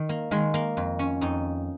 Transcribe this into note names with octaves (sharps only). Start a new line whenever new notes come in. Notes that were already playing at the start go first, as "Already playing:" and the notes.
Already playing: D#3
A#3
D#3 G#3
A#3
F2
C#4
F2 D#4